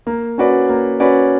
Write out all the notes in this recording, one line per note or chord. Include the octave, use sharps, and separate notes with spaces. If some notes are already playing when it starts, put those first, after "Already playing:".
A#3
C#4 F#4 B4 D5
A#3
C#4 F#4 B4 D5